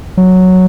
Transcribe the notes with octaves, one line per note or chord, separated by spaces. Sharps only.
F#3